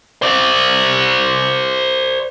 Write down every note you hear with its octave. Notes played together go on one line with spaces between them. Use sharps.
C5 D5